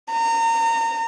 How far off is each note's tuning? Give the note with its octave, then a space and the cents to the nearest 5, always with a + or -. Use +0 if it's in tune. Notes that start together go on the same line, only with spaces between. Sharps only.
A#5 -30